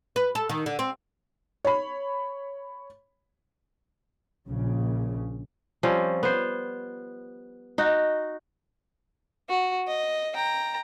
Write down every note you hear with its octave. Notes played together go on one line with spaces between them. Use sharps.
B4
A4
D#3
D3
C4
C#5 B5
A#1 C#3
F3 G3 C4 C#4
B3 C5
D#4 F#4
F#4
D#5
G5 A#5